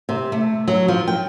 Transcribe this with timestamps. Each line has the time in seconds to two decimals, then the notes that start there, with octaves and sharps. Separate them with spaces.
0.09 C3
0.32 A3
0.68 F#3
0.88 F3
1.07 G5